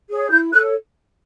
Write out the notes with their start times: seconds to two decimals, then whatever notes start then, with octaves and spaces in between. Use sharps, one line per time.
0.08 G#4 C#5
0.30 E4 G6
0.52 A4 C#5 F#6